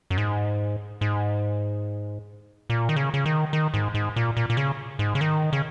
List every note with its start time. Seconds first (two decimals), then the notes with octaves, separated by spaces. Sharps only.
0.11 F#2
0.18 G#2
1.01 G#2
2.70 A#2
2.89 D#3
2.96 C#3
3.14 C#3
3.26 D#3
3.53 D#3
3.74 G#2
3.94 G#2
4.16 A#2
4.37 A#2
4.50 A#2
4.57 C#3
4.99 G#2
5.15 C#3
5.21 D#3
5.53 C#3